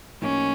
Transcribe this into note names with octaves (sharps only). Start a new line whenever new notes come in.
A2 F3 A#3 C#4 D#4 G4